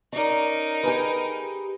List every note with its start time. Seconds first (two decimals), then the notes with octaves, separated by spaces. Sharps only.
0.13 C#4 D#4 A#4 D5
0.83 G4 G#4 B4